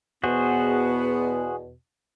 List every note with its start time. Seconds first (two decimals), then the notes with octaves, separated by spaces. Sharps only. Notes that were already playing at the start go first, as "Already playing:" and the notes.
0.24 E2 B2 B3 F#4 G#4 C5